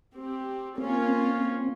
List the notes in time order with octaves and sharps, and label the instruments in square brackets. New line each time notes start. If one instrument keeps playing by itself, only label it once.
[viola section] C4 G4
[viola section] A#3 C#4 F4 [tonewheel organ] C4